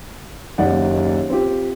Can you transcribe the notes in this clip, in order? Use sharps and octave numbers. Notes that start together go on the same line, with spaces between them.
F#1 D#2 D5 F#5
C4 F4 G4